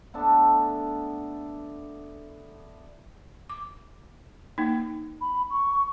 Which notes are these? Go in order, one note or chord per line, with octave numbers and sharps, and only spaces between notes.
A3 B3 D4 A4
D6
A#3 D#4
B5
C#6